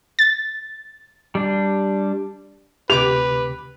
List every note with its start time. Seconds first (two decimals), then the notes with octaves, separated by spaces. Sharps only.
0.19 A6
1.35 G3 D4
2.90 D2 C3 G4 B4 D6 F7